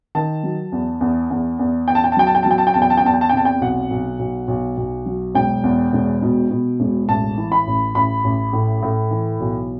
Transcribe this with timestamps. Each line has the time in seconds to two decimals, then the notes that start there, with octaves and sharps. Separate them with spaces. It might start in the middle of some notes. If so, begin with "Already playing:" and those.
0.15 D#3 A5
0.44 F#3
0.72 E2
1.01 E2
1.30 E2
1.59 E2
1.88 E2 G5
1.95 A5
2.04 G5
2.12 A5
2.17 F#3 G5
2.27 A5
2.35 G5
2.43 A5
2.46 F#3 G5
2.58 A5
2.67 G5
2.74 E2 A5
2.82 G5
2.90 A5
2.97 G5
3.04 E2 A5
3.14 G5
3.21 A5
3.29 G5
3.33 C3 A5
3.45 G5
3.61 B1 F#5
3.91 B1
4.19 B1
4.48 B1
4.77 B1
5.06 F#3
5.35 E1 G5
5.63 E2
5.93 E1
6.22 B2
6.50 B2
6.80 E1
7.09 A1 A5
7.37 E3
7.52 B5
7.67 A1
7.95 A1 B5
8.24 A1
8.53 A2
8.83 A2
9.11 E3
9.40 B1